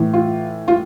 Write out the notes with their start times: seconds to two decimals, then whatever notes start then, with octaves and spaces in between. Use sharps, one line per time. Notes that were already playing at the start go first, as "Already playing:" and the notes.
Already playing: A2 E3
0.13 F4
0.68 F4